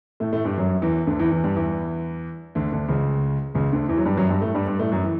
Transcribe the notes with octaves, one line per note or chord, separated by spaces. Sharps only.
A2 A3
A2 A3
G2 G3
F#2 F#3
E2 E3
D2 D3
E2 E3
E2 E3
G2 G3
E2 E3
D2 D3
D2 D3
C#2 C#3
C#2 C#3
D2 D3
E2 E3
F#3
G2 G3
F#2 F#3
G2 G3
A2 A3
G2 G3
G2 G3
A2 A3
F#2 F#3
E3